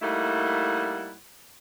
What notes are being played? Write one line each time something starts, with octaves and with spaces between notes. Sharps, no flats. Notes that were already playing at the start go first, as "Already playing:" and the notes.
G3 A3 A#3 D#4 E4 F#5